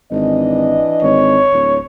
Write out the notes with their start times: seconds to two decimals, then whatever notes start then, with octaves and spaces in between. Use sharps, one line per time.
0.11 G#1 E3 D4 D#5
1.02 G#1 C#5
1.52 D1